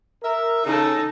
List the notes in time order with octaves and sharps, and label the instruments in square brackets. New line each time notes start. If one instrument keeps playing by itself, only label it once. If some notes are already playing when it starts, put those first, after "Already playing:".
[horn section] A#4 E5
[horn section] C#3 [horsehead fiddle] D#4 A4